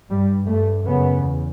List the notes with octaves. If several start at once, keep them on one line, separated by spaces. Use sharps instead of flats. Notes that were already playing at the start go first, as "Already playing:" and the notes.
G2 G3
G2 A3
F#2 C#3 B3
E2